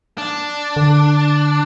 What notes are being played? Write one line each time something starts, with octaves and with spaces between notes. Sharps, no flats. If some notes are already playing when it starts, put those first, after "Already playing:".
D4
D3